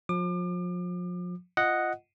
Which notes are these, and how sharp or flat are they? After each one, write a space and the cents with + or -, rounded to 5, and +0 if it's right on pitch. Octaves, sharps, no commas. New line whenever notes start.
F3 +35 D6 +40
F4 -10 D#5 +0 F#5 +0